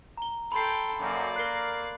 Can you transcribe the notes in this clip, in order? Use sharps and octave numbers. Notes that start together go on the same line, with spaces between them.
A#5 G7
A4 G5 B5 C6 C7
F#2 A#3 D5
A#4 F#6 C7 G7